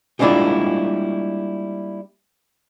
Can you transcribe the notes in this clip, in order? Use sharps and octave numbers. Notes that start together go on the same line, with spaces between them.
G3 G#3 A#3 D4 E4 F4